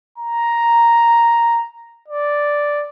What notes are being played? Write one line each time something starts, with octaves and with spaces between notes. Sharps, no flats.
A#5
D5